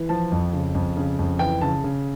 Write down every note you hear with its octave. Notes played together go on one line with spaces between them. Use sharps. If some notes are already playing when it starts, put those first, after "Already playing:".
Already playing: E3
F3 A5
F2
C#3
F2
C#3
F2
E3 G5
C#3 A5
C#3